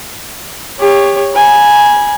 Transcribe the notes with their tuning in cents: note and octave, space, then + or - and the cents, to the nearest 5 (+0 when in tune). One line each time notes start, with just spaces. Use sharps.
G4 +30 C#5 +0
G#5 +0 B5 -30